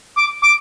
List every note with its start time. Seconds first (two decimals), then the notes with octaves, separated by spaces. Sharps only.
0.17 D6
0.43 D6